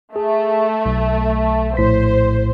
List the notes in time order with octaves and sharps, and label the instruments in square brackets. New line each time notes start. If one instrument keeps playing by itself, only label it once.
[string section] A3 [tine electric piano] G#4
[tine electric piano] B1
[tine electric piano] A#1 A2 B6 [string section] C5